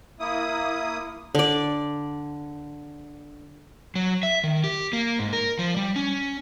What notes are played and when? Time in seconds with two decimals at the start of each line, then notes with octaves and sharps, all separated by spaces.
0.20 A#3 E4 D#6
1.35 D3 D5
3.95 F#3
4.23 E5
4.44 D#3
4.64 G4
4.93 A#3
5.19 G#2
5.33 A#4
5.59 F3
5.77 G3
5.96 C#4